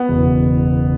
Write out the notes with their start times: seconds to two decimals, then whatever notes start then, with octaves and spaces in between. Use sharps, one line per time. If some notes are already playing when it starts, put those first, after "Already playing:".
Already playing: B3
0.09 F#1 E2 B2